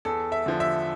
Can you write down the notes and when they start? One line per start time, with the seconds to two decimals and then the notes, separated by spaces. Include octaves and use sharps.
0.05 E2 A4
0.32 E5
0.46 D3 F3
0.60 E5